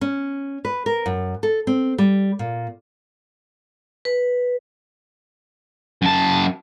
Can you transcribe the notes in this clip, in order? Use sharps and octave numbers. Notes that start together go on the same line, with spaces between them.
C#4
B4
A#4
F#2
A4
C4
G3
A#2
B4
F#2 A5